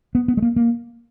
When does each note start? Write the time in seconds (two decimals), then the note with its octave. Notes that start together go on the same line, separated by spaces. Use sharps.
0.15 B3
0.28 B3
0.37 G#3
0.42 A#3
0.56 A#3